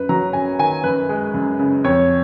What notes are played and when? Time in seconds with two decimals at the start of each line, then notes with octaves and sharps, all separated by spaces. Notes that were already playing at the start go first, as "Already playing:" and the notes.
Already playing: F#2 B4
0.09 F#3 A#5
0.33 F#2 G#5
0.59 D#3 G#5
0.84 F#2 B4
1.09 G#3
1.34 F#2
1.59 C#3
1.84 F2 C#5